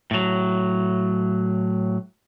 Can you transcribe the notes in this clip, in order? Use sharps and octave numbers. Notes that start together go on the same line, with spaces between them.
A2 F#3